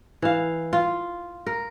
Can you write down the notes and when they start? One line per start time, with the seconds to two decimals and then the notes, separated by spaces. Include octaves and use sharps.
0.22 E3 F5
0.73 F4
1.46 A#4